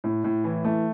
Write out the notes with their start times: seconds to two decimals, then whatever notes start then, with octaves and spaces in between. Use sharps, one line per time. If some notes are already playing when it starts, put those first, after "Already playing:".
0.04 A2
0.24 A2
0.44 E3
0.64 A3